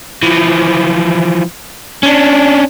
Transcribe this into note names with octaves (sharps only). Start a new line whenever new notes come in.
E3 F3
C#4 D4